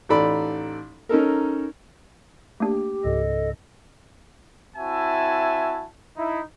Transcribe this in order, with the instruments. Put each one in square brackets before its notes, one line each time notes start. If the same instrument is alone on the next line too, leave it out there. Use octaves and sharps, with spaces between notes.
[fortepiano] A1 D#4 A4 D5 B5
C#4 D#4 A4 A#4
[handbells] A3 A#3 D4 [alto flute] G4
[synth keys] C#2 G#2 C#3 [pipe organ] A4 D#5
[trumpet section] C4 E4 F#4 E5 G#5 A5
D#4 E4